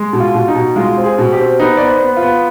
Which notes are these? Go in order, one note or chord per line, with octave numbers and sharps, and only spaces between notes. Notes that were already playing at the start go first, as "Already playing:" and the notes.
Already playing: G#3
B2
F4
B2
D#4
B2
G#3 F4
C4
G#4
B2
G4
C4
B3 D#4
B3 D5
C5
B3
F4
B3